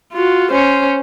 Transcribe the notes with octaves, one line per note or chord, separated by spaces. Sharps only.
F4 F#4
C#4 C5